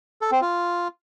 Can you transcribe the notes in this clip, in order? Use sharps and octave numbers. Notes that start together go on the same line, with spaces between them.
A4
C4
F4